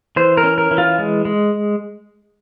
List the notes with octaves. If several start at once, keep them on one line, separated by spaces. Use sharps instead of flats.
E3 C5
A#4
C#4
A#4
E3
F4
G#3
G#3